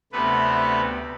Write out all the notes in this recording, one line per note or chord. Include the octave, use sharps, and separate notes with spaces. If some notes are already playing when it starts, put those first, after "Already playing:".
D2 C3 A3 B3 B4